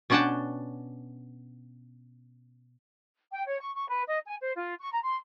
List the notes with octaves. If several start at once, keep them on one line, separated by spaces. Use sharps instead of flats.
B2 C#4 D4 F#5 G5 A5
G5
C#5
C#6
C#6
B4
D#5
G#5
C5
F4
C#6
A#5
C6